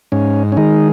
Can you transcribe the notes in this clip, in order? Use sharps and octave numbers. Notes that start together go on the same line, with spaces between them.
G#2 C#4
C#4
D#3 G#3 D#4